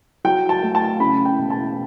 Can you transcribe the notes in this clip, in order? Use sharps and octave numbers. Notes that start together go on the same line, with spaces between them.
F#3 G5
A5
A3
A5
C#3 B5
G5
E1
A5